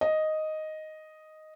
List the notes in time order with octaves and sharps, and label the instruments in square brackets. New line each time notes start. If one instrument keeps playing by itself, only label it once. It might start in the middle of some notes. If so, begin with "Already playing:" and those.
[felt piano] D#5